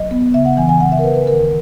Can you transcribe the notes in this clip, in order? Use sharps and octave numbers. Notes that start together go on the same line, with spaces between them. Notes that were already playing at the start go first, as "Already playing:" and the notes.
Already playing: F#3 D#5
B3
C#3 E5
F#5
E3 G#5
G#5
C#3 F#5
E5
A#4
E3 B4
B4
D#3 A#4